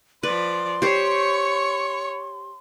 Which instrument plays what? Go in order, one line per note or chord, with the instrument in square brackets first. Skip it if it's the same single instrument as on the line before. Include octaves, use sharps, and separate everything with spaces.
[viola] F3 D5 [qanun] B4 [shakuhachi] C6
[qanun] G4 C5 [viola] C#5 C#6